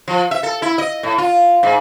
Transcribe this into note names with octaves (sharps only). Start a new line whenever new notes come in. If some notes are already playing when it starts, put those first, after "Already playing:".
F3
E5
A4
E4
D#5
A2
F4
G#2